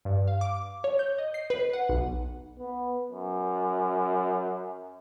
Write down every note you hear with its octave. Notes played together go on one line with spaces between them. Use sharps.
G2
F5
D6
C#5
G6
D#5
C7
B4
F#5
B1
B3
F#2